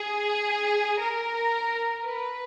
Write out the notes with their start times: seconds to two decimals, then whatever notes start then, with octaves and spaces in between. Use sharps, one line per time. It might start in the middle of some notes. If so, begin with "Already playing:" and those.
Already playing: G#4
0.99 A#4
2.05 B4